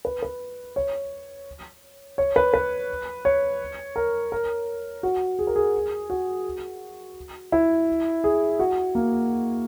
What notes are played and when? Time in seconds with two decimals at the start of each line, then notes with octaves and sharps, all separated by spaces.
0.05 B4
0.22 B4
0.76 C#5
2.18 C#5
2.36 B4
2.54 B4
3.25 C#5
3.96 A#4
4.32 A#4
5.03 F#4
5.39 G#4
5.47 A#4
5.56 G#4
6.10 F#4
7.52 E4
8.24 G#4
8.59 F#4
8.95 A#3